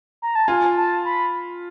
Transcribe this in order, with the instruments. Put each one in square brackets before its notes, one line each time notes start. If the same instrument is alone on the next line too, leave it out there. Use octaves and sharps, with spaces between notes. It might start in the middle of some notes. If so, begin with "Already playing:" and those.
[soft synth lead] A#5
A5
[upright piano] F4 [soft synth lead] G#5
[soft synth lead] A5
B5